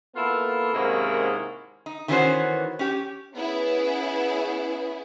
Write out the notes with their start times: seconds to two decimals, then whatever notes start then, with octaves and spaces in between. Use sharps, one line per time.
0.16 A#3 B3 E4 F4 A4
0.74 G#2 C3 D#3 A#3 C#4 E4
1.86 D#4
2.08 D#3 E3 B3 C#4 F#4 C5
2.79 C#4 G4
3.34 B3 C#4 E4 G#4